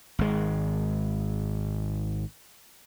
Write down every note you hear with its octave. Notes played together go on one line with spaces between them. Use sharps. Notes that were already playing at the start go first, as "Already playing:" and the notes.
G#1 G#3